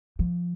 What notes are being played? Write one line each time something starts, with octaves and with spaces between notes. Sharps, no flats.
F3